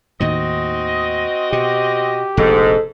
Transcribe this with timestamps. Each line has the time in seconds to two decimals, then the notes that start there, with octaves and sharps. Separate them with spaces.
0.20 D#2 A2 D#3 C4 F#4 D#5
1.52 B2 G4
2.37 F1 A#1 G#2 B2 A4